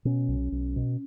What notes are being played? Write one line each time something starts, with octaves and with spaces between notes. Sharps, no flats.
B2 C#4
B1
B1
B2